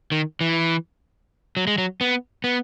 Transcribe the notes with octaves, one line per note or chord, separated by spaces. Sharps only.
D#3
E3
F#3
G#3
F#3
B3
B3